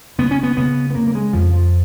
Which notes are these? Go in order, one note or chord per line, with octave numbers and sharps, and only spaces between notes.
C#3 B3
C#4
B3
C#3 B3
B3
C#3 A#3
A#3
G#3
F2 F3
F3